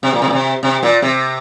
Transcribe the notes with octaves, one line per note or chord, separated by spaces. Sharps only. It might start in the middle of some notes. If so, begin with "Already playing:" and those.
C3
A#2
C3
A#2
C3
C3
A#2
C3